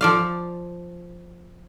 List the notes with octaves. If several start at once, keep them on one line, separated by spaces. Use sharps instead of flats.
F3 D5 F5